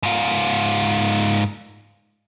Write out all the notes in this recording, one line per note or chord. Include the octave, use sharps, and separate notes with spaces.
G#2 F4